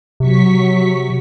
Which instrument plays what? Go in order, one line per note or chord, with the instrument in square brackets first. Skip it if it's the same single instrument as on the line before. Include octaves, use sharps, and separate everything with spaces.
[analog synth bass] C3 [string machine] F#3 C#6 B6